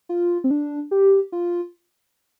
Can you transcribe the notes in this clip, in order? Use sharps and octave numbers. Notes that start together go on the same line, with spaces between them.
F4
C4
D4
G4
F4